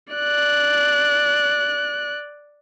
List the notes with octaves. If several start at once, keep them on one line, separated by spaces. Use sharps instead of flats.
D5 F#6